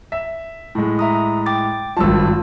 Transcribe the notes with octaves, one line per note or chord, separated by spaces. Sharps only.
E5
A2 G#3
E5 A#5 D#6
G5 D6 A6
G#1 G2 F4 A5 E6